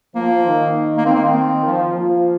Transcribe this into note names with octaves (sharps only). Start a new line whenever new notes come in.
F3 A#3
D#3
A#3
D#3 C4
A#3
C4
F3
F3 A#3